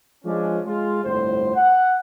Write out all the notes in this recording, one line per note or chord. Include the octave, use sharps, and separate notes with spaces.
F3 G#3 C#4 D4
G#3 F4
G1 C2 F2 A2 C5
F#5